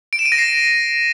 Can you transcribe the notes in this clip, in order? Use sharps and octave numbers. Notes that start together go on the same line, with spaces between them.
D7
E7
D#7
A#6
C7